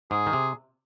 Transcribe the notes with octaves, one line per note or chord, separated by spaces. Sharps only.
G#2 G#4
D#3
C3